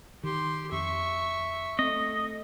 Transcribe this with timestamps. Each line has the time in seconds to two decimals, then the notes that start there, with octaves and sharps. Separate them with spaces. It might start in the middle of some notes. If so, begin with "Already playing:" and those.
0.23 D#3 G4 C6
0.72 F2 E5 C#6
1.79 A3 C4 D#5